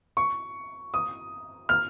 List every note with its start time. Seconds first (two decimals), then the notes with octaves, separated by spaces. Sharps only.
0.17 C#6
0.94 D#6
1.69 F6